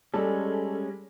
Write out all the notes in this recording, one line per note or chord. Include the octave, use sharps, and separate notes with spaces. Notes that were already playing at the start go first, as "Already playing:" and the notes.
G3 G#3 C#4 A4